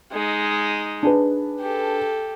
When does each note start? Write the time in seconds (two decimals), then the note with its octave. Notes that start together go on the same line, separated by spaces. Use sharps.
0.12 G#3 D#4
1.03 D4 G#4 B4
1.60 G4 A4